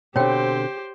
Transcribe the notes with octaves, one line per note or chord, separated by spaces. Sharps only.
B2 D3 C4 G4 C5 C#5 G5